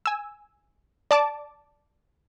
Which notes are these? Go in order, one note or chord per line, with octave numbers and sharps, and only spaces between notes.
G#5 E6
D5 A5 D6